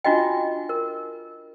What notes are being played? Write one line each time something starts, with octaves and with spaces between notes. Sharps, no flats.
D4 F4 F#4 D#5 G5
A#4